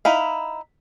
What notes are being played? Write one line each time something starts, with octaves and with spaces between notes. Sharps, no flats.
D#4 E4 F5